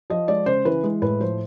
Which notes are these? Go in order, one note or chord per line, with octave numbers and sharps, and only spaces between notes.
F3 D#5
G#3 D5
C#3 C5
E3 B4
G#3
A2 B4
F3 C5